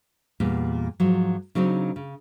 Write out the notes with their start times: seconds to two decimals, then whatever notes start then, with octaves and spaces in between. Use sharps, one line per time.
0.40 E2 A#2 G3 B3
1.00 G#2 F3 F#3
1.55 C#3 F#3 C4 D4 D#4
1.96 C#3